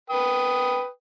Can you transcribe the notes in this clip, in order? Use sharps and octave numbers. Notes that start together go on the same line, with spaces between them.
B4 G5 D#6